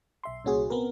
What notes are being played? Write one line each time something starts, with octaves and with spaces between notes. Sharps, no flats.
B1 E5 C6
C2 A#2 C#4 F#4 G#4
B3 C4 A#4